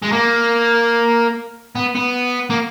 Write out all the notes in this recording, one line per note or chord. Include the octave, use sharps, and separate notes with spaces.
G#3
A#3
B3
B3
A#3